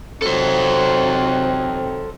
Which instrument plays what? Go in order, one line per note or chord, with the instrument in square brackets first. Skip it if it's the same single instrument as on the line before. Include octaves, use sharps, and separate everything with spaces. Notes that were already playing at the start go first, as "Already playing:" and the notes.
[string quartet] C3 F#3 D#4 [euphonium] C4 [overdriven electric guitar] A4 C5